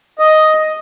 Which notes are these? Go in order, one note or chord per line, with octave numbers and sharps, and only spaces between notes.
D#5